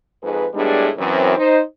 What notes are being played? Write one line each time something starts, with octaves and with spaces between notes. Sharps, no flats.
F2 G#2 G#4 B4
A2 G3 G#3 B3 D4 G#4
F#2 E3 C4
D#4 C5